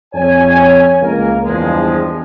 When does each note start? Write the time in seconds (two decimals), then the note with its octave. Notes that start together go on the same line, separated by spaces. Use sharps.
0.14 F2 C#5 G#5
1.01 C#2 A#3 A#4
1.46 E2 G2 F3 G#3